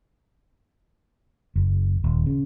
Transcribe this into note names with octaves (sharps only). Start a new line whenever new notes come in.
F#1
D#1
C#3